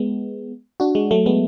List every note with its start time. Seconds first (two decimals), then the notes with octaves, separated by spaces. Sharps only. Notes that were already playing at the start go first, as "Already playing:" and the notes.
Already playing: G#3 B3
0.80 D4 F#4
0.95 G#3
1.11 F#3 A3
1.26 G#3 B3